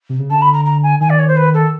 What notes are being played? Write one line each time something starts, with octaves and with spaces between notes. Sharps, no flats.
C3
C#3
D3 A5
B5
A#5
A#5
G#5
D#3 G#5
D5
C#5
C5
B4
A4